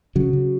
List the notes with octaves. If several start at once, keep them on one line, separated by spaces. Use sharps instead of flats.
C#3 F#3
C#3